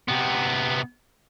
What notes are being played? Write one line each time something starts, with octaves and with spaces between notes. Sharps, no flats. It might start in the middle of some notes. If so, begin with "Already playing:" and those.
C3 B3